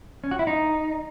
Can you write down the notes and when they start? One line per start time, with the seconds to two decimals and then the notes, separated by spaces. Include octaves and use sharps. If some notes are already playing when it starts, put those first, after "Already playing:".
0.24 C#4
0.31 F#4
0.39 E4
0.47 D#4